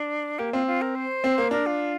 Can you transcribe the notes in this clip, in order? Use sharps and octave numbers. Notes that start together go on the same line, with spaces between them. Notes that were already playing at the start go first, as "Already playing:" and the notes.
Already playing: D4
A#3 G4
C4 F4
F4
A#4
C5
C4
A#3
D4 A#4
F4